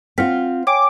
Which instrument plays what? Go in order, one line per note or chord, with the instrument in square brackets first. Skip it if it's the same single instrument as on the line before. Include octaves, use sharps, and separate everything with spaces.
[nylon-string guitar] C4 F4 [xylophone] F#5 F6 B6
[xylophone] C#5 G5 G#5 [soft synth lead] D6